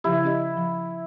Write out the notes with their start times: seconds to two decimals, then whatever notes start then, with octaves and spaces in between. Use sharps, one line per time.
0.04 C#3 F3 E4 G4
0.24 C#4 G4 D#5
0.57 F3